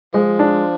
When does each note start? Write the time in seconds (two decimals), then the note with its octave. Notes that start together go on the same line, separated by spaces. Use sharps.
0.14 F3 G#3
0.39 D4